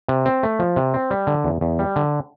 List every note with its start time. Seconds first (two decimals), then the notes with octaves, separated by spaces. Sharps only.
0.08 C3
0.26 C4
0.43 A3
0.59 F3
0.76 C3
0.94 C4
1.11 G3
1.27 D3
1.44 E2
1.61 E2
1.79 G3
1.96 D3